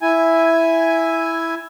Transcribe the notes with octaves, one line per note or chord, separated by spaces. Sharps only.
E4 G#5